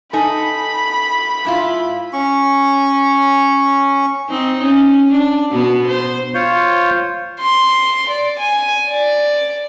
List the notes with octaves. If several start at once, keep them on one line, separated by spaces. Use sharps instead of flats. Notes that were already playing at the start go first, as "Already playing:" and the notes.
D#4 A4 G#5 B5
G#2 E4 F4
C#4 C#6
C4 D#4
C#4
D4
B2 B3 F#4
C5
F4 C5 C#5
C6
D5
G#5
D5